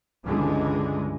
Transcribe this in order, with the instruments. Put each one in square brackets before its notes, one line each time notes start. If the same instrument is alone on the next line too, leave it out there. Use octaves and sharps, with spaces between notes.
[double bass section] C#2 G2 D3 E3 G#3